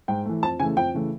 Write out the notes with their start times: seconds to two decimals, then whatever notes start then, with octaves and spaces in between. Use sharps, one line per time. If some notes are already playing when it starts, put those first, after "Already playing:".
0.08 G#2 G5
0.25 E3 A3
0.42 F2 A5
0.59 C#3 E3 A3 G#5
0.76 F2 G5
0.94 C#3 E3 A3